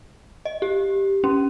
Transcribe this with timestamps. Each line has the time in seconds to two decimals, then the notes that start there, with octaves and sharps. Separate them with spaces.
0.45 D#5
0.62 G4
1.24 C#4